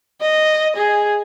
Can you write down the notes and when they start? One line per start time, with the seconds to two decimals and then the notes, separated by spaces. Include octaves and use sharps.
0.21 D#5
0.77 G#4